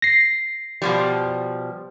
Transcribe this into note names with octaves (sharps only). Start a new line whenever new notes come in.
A#6 C7
B2 F3 G3